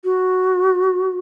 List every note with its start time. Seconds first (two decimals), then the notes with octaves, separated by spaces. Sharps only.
0.04 F#4